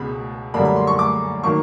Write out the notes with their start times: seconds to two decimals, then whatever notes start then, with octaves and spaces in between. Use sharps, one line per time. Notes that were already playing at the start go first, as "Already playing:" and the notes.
Already playing: C#2 B2 G#3 B5
0.54 F#2 D3 G3 A#3 B5
0.65 B5
0.76 C6
0.87 C#6
0.99 D6
1.44 D#3 F#3 A#3 C#6